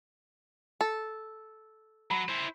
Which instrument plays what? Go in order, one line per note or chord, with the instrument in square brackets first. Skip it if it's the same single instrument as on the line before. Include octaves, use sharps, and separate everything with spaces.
[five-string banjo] A4
[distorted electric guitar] F#3 [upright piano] B5
[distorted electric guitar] E4 C5